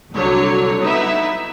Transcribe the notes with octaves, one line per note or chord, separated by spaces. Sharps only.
C2 D3 F#3 C#5
B3 D#4 E4 B4 E5